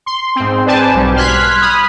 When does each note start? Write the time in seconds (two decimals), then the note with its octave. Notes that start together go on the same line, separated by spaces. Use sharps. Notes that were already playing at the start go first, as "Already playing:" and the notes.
0.06 C6
0.36 G#2 C4
0.66 B4 C5 D5 G#5 A5
0.93 B1 G3
1.16 C6 F6 F#6 G#6 B6
1.61 B5 D#6 F6